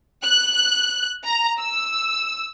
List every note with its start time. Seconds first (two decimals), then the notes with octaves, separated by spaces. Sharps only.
0.24 F#6
1.25 A#5
1.60 E6